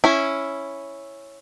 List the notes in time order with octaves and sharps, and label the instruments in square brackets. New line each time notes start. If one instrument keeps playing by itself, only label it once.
[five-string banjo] C#4 E4